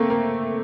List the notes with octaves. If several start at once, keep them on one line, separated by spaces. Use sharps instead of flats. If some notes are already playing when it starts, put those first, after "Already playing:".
Already playing: A3 A#3 C4
A#3